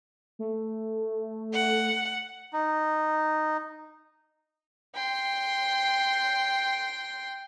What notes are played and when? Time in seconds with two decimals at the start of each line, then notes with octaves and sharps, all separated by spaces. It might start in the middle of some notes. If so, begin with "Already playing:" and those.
0.39 A3
1.54 F#5
2.53 D#4
4.95 G5 C6